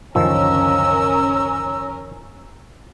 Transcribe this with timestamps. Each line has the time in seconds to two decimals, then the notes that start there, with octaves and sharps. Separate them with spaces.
0.15 C#2 F#2 D3 D#3 F3 C#4 A#4 E6